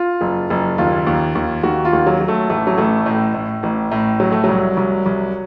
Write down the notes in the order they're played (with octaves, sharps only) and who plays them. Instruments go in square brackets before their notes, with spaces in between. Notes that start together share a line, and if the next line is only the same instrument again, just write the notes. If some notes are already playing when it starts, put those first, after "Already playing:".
Already playing: [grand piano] F4
F#1
F#1
D#2 F4
D#2
D#2
D#2 F#4
F4
D#2
F#3
F#3
A3
A1 A3
F#3
A1 A3
A2
A2
A1
A2
F#3
A3
C2 F#3
C2
C2